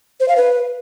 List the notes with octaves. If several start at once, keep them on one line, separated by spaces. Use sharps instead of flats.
C5
F5
B4